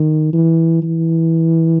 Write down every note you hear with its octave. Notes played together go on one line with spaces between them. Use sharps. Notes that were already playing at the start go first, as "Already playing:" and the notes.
Already playing: D#3
E3
E3